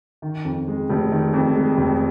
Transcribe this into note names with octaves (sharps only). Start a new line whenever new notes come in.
D#3
F2
G#3
F1
D#3
F2
G#3
F1